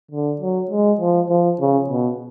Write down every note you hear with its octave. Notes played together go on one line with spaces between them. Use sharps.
D3
F#3
G#3
F3
F3
C#3
B2